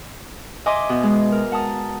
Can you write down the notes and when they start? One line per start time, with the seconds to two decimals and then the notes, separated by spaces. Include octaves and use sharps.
0.66 D#5 E5 G#5 C6 D6
0.89 B2
1.03 G#3
1.32 A#4
1.52 F#5 A5 A#5 D#6